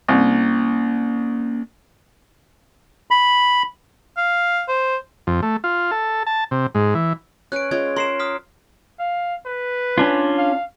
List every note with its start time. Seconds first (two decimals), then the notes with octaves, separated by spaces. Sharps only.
0.09 C2 A#3 C#4
3.11 B5
4.17 F5
4.68 C5
5.27 F2
5.42 A3
5.64 F4
5.91 A4
6.27 A5
6.51 C3
6.75 G#2
6.95 E3
7.52 C#4 B4 F#6 D7
7.71 G#3 C#4 F4 G#6
7.96 A#4 C6 C7 E7
8.19 D#6 F6 B6
9.00 F5
9.46 B4
9.98 C#4 D4 F4
10.38 F5